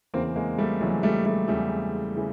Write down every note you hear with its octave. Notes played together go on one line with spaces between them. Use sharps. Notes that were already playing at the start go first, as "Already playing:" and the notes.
E2 C#3 E3 A#3 C4
G#3 A#3
G3 A3
E2 C#3 E3 F#3 G#3
G3 A3
G3 A3
E2 C#3 E3 G3 A3
C#3 E3